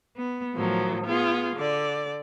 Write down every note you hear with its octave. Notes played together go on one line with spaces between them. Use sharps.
B3
A2 D#3 F3 F#3
B3 F4 G#4
D3 D5